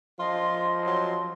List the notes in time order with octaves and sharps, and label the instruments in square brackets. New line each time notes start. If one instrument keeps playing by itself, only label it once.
[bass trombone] F3 [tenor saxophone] F4 [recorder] D#5 [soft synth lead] C6
[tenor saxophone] F#3